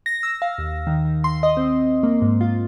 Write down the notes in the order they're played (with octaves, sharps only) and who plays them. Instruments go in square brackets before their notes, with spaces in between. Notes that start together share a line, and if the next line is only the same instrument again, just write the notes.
[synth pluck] A#6
E6
F5
D#2
D#3
D#3
C6
D#5
C4
A#3
G#2
F4